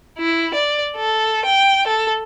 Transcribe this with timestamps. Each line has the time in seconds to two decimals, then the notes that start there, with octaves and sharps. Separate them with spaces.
0.17 E4
0.54 D5
0.95 A4
1.44 G5
1.88 A4